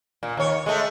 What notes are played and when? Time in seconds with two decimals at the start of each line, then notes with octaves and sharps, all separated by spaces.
0.23 A#2
0.37 D#2 C#5
0.66 G#3 A3